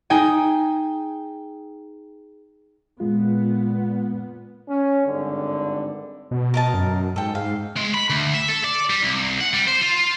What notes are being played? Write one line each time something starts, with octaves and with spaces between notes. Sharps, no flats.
D#4 G#4 G5 G#5
A#2 G#3 B3 F4
C#4
G#1 G2 D3
B2
A#4 D#5 A5
F#2
G#2 A4 G5
G#2 F5
G#3
B5
D2
E5
A4
D5
G3
C2
F#5
G3
C5
F4